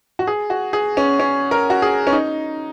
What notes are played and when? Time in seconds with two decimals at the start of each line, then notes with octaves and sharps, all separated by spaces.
0.19 F#4
0.27 G#4
0.50 F#4
0.73 G#4
0.97 C#4
1.20 C#4
1.51 A#4
1.70 F#4
1.82 G#4
2.07 C#4
2.12 D#4